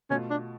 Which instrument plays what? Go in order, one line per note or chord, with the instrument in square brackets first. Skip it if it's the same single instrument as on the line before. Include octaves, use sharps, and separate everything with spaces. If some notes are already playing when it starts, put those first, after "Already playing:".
[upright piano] B2 A3 F4 [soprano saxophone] C#4
[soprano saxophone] D4